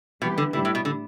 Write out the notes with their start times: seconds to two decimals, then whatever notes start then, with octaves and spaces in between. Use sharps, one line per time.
0.21 B2 E3 G3 B3 G4
0.38 D3
0.53 A2 D3 G3 E4 G4
0.65 A2
0.75 B2
0.85 D3